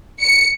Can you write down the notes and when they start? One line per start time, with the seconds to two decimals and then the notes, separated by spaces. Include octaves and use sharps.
0.21 C#7